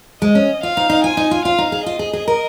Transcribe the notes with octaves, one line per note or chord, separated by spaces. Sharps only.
G#3 D#5
C#4
F4 F5
D#4
D#4
F4 G#5
D#4
F4
F4 F5
D#4
G#4
F4 D#5
G#4
G#4
A#4